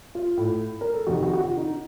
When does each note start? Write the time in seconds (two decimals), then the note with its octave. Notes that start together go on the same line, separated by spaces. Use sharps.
0.15 F4
0.37 A2
0.81 A#4
0.94 A4
1.07 F2 C3 D#3 F#4
1.23 F#4
1.33 F#4
1.40 F4
1.57 D#4